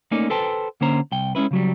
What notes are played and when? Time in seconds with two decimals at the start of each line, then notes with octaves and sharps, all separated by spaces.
0.11 A3 A#3 C#4 D#4 D5
0.30 A4 B4 C5 G5 A5
0.81 D3 A#3 C#4 C5 A#5
1.12 C2 G5
1.35 G#3 C#4 D4 E4 B4
1.51 C#3 F#3 G3